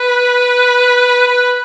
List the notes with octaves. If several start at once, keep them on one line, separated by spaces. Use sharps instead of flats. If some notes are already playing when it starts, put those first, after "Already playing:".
Already playing: B4
B4